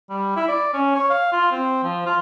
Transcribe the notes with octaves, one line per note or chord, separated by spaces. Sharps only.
G3
E4
D5
C#4
C#5
F5
F4
C4
F3
F4